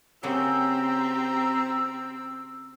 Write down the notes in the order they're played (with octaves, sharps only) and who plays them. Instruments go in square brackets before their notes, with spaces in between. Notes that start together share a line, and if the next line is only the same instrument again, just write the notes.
[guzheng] C#3 F#3 A#3 [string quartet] C4 [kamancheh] G4 A#5 [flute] E6